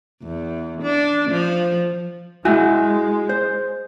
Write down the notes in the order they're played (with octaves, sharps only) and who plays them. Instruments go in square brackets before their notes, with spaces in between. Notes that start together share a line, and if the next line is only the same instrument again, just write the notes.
[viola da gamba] E2
D4
F3
[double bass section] G#3 [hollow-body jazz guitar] E4 F#4 G#5
[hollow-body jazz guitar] C5